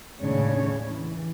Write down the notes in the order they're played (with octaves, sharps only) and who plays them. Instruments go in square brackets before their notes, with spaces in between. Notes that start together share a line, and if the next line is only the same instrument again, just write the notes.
[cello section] D#2 A2 C#3 D4 C#5
E3